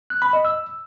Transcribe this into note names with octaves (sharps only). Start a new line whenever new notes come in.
F#6
B5
D#5
E6